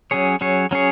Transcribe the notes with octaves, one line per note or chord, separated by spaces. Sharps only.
F#3 C#4 G#4 C#5
F#3 C#4 G#4 C#5
F#3 C#4 G#4 C#5